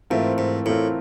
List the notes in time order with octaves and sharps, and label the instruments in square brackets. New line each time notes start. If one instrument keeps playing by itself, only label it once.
[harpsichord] G#2 [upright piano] E3 A3 C4 F4 A#4
[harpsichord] G#2
[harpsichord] A2 [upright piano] E3 A3 C4 F4 A#4